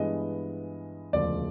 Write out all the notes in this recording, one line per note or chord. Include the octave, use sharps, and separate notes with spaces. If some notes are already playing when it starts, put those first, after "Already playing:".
Already playing: G2 E3 G#3 B3 D#5
E1 D2 C#3 F3 D5